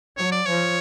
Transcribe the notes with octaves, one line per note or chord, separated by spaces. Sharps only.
F#3 C#5
D5
F3 C#5